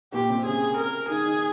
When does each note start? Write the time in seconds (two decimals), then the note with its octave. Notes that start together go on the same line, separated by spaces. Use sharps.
0.12 A#2 A#3 G4
0.29 C3 C4
0.45 C#3 C#4 G#4
0.77 A#4
1.09 D#3 D#4 G#4
1.25 D#3 D#4